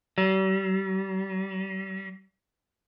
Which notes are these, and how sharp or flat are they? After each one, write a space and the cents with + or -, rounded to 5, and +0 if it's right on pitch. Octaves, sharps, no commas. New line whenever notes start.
G3 -40